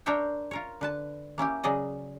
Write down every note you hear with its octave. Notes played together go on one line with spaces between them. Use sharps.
D4 A#4 C5 C#5 E5 G5
F4 A#4 C#5
D3 B4 A5
A#3 C#4 E4 G4
C#3 F#3 G#4 D5 D#5